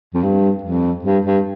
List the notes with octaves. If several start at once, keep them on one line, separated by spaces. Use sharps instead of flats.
F2
G2
F2
G2
G2